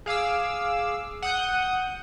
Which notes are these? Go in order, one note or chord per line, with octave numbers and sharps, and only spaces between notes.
G#4 F5 D6 E6
F#5 D#6 G6